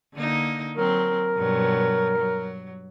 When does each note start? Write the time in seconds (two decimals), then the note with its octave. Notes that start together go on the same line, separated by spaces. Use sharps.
0.15 D3 A#3 D#4
0.76 F#3 C4 A#4
1.37 G2 B2 F#3
2.18 F#3